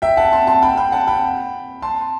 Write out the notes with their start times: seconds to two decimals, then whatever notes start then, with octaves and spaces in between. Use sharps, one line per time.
0.02 E5 G5
0.17 F#5 A5
0.32 A5 C6
0.47 A5 C6
0.63 G5 B5
0.77 G5 B5
0.92 F#5 A5
1.07 G5 B5
1.82 A5 C6